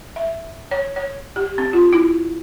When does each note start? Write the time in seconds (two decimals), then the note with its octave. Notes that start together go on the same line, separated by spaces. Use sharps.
0.16 E5
0.71 C#5
0.96 C#5
1.36 G4
1.58 C4
1.73 F4
1.93 E4